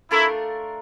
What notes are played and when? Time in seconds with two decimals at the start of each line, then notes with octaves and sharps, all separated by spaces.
0.11 A3 D4 E4 F4 A#4